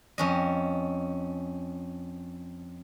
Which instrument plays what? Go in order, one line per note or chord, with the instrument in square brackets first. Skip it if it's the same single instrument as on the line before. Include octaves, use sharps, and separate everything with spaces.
[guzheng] F2 C#4 D#5